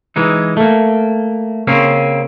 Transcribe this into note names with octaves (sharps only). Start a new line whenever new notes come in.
E3 G#3 D#4
A3 A#3
C#3 A#3 C4 C#4